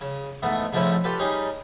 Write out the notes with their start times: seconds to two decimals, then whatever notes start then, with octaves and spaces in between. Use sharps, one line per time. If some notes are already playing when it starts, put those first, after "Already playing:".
0.01 C#3
0.43 G#2 E3 A3 B3
0.73 G#2 F3 A3 C4 C#4 E4
1.04 F4 G4 A4 B4
1.19 G3 C#4 D#4 G#4